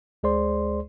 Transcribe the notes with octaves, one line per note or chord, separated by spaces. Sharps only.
D2 G#3 G#4 C5 D5 C6